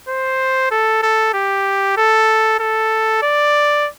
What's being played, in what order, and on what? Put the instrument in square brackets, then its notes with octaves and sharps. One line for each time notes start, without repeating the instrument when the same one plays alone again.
[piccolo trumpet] C5
A4
A4
G4
A4
A4
D5